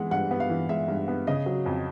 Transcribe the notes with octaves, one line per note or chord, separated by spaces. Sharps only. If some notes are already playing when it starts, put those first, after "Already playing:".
Already playing: E3 G#3 B3 F#5
G2 F#5
B3
F5
E3
G#3 E5
G2
B3
C#3 D#5
F#3
F2